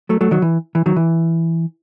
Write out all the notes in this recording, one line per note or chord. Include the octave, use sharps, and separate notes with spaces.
F#3 A3
F#3 A3
D#3 F#3
E3
E3
D#3 F#3
E3